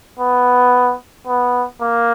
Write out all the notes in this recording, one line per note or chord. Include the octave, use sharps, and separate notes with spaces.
B3
B3
A#3